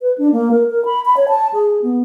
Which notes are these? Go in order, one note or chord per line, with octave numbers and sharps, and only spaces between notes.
B4
D4
A#3
A#4
A#4
B5
B5
C#5
A5
G#4
B3